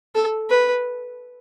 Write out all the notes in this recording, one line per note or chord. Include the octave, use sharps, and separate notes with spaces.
A4
B4